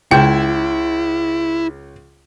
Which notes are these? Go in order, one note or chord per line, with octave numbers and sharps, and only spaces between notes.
C#2 E4 G5 G6